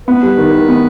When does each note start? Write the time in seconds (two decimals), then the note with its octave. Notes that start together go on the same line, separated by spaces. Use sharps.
0.08 B3 B4
0.23 G3
0.38 D#3
0.53 D#3
0.69 B3